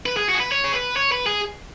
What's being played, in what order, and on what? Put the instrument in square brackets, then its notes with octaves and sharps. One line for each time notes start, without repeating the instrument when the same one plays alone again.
[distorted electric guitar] B4
G#4
F#4
G#4
B4
C#5
G#4
B4
C#5
B4
G#4